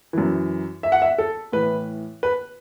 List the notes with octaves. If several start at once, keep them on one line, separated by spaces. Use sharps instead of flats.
F#2 E3
E5
F#5
E5
A4
A2 E3 B4
B4